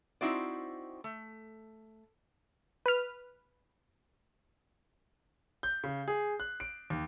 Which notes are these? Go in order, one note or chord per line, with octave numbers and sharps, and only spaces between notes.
C4 D#4 E4 F#4 C5 D5
A3
B4 F6
G6
C#3
G#4
F#6
D7
D#2